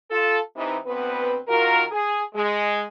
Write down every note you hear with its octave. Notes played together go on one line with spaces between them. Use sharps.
F4 A4
C3 E3 D#4
D2 B3 C4 B4
D#3 F4 F#4 A#4
G#4
G#3